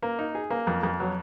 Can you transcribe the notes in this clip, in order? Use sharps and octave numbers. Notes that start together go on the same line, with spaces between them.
A#3
D#4
G#4
A#3
F2
F2
F#3